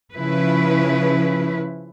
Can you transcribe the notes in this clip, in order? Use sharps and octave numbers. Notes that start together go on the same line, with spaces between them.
C#3 F3 E4 B4